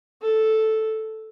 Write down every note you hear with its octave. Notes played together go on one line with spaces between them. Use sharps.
A4